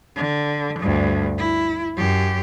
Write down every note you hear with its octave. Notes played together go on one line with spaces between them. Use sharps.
D3
D2 G2
E4
F#2 G4